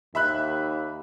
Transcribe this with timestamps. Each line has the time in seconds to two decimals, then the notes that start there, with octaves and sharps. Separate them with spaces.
0.15 D#2 E5 B5 F#6